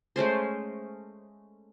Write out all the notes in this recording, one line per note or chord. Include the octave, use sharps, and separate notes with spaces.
G#3 A3 C#4 C5